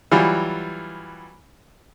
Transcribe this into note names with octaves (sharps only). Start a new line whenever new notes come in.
E3 F#3 G3 F4